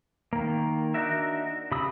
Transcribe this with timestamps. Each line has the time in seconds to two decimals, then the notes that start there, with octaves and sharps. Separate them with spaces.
0.33 D#3 A#3
0.94 D4 D#4 F#4 A#4 E5
1.71 C#3 G4 B5 D#6 E6